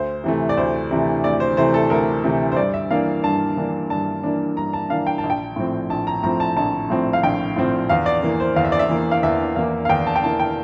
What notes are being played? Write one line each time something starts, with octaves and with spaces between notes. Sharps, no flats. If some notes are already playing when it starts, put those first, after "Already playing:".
Already playing: D2 C5
C3 E3 A3
D5
D2 C5
C3 E3 A3
D2 D5
C5
C3 E3 A3 C5
A4
D2 A#4
C3 E3 A3
C5
G2 D5
E5
E3 A#3 D4 F5
G2 A5
E3 A#3 D4
G2 A5
E3 A#3 D4
G2 A#5
A5
E3 A#3 D4 F5
G5
A5
A#1
G5
A2 F3 C4
A#1 A5
A#5
A2 F3 C4 A#5
A5
A#1 A5
A2 F3 C4
F5
A#1 G5
A2 F3 C4
E2 F5
D5
E3 A#3
C5
E2 F5
E5
D5
E5
E3 A#3
F5
E2 E5
E3 A#3 F5
F5
E2 G5
A5
G5
E3 A#3 A5
G5